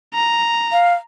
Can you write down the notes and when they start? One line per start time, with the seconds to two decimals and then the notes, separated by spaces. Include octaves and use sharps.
0.14 A#5
0.72 F5